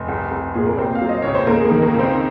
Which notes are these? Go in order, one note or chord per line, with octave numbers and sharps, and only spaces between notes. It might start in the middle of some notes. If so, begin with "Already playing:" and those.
Already playing: F1
C2
C2
A#2 G#4
A#4
C3 C4 C5
F5
F#3
D#5
C#2 C#5
C5
C#2 A#3 A#4
G#4
A#3 A#4
D#3
A#3 A#4
C#2 C4 C5